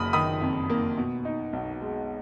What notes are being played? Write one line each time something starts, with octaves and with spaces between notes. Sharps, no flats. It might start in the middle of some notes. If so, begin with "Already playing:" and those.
Already playing: F#1 A#3 B5 D#6 F6
D#3 B5 D#6
F2
A#3
B2
D#4
B1
G#3